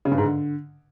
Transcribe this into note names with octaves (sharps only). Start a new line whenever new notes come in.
C#3
G2
G#2
D3